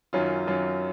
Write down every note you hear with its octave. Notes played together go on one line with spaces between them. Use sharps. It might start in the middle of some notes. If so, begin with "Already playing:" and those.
F#2 D#3 F#3 C#4 F4
F#2 D#3 F#3 C#4 F4